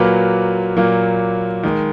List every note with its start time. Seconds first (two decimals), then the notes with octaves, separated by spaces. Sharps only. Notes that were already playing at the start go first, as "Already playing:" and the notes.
Already playing: A#2 F#3 A#3 B4
0.77 A#2 F#3 A#3
1.63 D#3 G#3